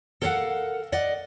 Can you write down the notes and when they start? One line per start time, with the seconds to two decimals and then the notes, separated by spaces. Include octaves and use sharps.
0.22 A4 A#4 C#5 F5 F#5
0.92 D5 D#5 F#5